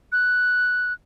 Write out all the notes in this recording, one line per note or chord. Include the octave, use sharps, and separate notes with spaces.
F#6